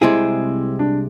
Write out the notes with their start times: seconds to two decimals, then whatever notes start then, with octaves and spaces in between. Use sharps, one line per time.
0.01 C2 C3 G#3 C4 E4 G#4
0.79 D4